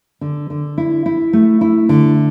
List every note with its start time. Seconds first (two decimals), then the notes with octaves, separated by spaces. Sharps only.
0.21 D3
0.50 D3
0.78 E4
1.06 E4
1.33 A3
1.61 E4
1.89 D3